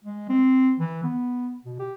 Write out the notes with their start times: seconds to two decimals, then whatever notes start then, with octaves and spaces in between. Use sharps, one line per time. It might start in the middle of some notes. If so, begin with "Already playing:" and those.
0.04 G#3
0.29 C4
0.79 E3
1.04 B3
1.65 B2
1.79 G4